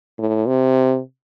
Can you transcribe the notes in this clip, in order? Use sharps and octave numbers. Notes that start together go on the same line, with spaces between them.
A2
C3